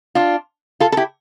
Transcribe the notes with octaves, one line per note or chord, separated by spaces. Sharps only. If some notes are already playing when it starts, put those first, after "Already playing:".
D4 F4
F4 A4
A4
E4 G4